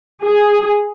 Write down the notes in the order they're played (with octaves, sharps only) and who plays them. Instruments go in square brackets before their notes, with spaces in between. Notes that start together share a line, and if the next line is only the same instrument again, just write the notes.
[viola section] G#4